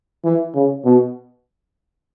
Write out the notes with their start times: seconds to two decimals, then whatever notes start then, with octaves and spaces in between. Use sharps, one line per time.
0.24 E3
0.55 C#3
0.85 B2